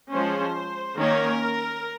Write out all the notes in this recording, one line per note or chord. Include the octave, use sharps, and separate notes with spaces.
F3 G#3 C#4 C5
D#3 A#3 C#4 A#4